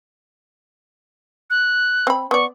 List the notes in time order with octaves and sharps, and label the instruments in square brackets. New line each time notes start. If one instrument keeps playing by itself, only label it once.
[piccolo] F#6
[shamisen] C4 B5
[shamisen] B3 D5 [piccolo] C#6